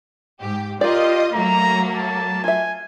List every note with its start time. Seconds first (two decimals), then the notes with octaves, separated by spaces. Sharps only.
0.41 G#2 G4
0.81 F4 G4 A#4 D5 D#5
1.34 F#3 A3 A#3 A#5
1.94 A5
2.44 F4 E5 G#5